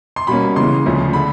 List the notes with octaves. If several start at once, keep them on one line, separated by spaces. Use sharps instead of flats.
C6
B2 G3 A#3 C#4 B5
C#3 E3 G#3 C6
D2 C#3 F3 G#3
D3 B5